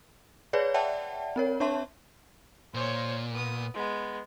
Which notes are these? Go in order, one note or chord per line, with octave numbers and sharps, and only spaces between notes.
G#4 B4 C#5 D5
D5 E5 F#5 G5 A5
C4 A#4 C#5
D4 C#5 E5 A5 C6
A#2 C5 C#5
B3 D#6
G#3 B3